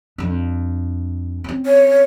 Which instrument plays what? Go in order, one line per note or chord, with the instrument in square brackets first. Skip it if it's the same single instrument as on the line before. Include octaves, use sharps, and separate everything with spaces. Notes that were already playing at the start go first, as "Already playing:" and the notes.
[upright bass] F2 D4
C4 C#4
[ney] C#5